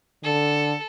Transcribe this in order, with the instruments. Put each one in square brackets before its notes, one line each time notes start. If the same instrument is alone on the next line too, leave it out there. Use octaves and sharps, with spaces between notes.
[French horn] D3 [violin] A4